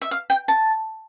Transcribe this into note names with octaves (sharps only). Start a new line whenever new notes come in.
E5
F5
G5
A5